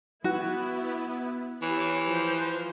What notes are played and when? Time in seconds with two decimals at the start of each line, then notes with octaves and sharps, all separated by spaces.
0.24 B3 E4 F#4
1.62 E3 G4 C#5
2.06 F3 C5